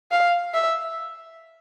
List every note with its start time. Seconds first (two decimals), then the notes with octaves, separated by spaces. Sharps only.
0.11 F5
0.54 E5